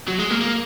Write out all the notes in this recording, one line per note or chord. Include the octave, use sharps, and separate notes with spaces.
F#3
G#3
A#3
A#3